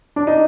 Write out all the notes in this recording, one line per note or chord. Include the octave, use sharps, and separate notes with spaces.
D4
D#4